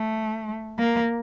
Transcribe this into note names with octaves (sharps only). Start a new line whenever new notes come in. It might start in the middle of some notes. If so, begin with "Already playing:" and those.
Already playing: A3
A#3